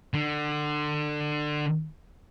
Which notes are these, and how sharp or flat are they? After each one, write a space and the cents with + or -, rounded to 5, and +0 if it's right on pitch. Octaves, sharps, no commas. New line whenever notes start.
D3 +25